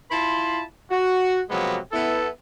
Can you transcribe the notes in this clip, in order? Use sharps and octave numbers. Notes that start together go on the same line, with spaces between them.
E4 F4 A5 B5 C6
F#4
C3 F3 F#3 G#3 A#3 B3
B3 E4 A4